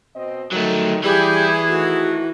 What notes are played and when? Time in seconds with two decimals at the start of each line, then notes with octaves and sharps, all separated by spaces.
0.15 B2 C4 D#5
0.52 D#3 F#3 G3 A3
1.04 E3 G3 E4 G4 G#4
1.68 F2 D#3 A3 F#4